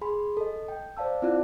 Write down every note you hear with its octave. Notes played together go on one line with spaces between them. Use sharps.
G#4 G#5 B5 C6
A4 D#5
G5
C5 D5 F5 A5 E6
C4 E4 F4 D5 F#6